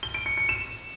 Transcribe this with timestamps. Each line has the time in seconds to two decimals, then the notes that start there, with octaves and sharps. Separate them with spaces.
0.03 G7
0.14 D7
0.26 C#7
0.37 C#7
0.49 E7